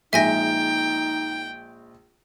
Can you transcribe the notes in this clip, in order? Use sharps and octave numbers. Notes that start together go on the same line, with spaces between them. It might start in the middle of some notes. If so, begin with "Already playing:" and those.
A#1 G#3 D#4 E5 G5 G#5 A#6